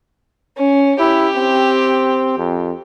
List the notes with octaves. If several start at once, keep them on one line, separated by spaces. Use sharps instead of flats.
C#4
E4 G4
C4
F2